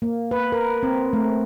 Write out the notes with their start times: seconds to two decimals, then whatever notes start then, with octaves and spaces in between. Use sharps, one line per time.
0.02 A#3
0.31 B4
0.52 A#4
0.83 C4
1.13 A3